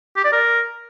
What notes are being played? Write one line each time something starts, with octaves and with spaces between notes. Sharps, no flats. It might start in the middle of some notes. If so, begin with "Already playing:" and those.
G4
D5
A#4